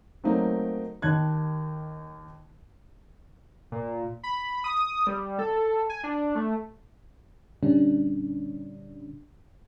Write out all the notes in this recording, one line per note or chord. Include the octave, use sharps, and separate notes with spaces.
F#3 A3 A#3 C4 D#4
D#2 D#3 A5 F#6 G#6
A#2
B5
D#6
G3
A4
G#5
D4
A3
A#2 D3 G3 C#4 D4